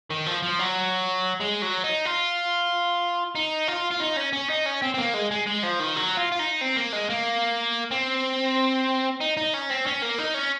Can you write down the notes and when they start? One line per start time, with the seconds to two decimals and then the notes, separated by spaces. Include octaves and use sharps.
0.10 D#3
0.26 F3
0.43 F3
0.59 F#3
1.41 G#3
1.62 F#3
1.84 D#4
2.06 F4
3.36 D#4
3.68 F4
3.91 F4
4.00 D#4
4.17 C#4
4.33 C#4
4.50 D#4
4.66 C#4
4.82 C4
4.94 C4
4.98 A#3
5.14 G#3
5.31 G#3
5.47 G#3
5.63 F3
5.79 D#3
5.96 F#3
6.17 F4
6.32 F4
6.39 D#4
6.61 C4
6.77 A#3
6.93 G#3
7.10 A#3
7.91 C4
9.21 D#4
9.37 D#4
9.54 C#4
9.69 C4
9.86 C#4
10.02 A#3
10.18 D#4
10.34 C#4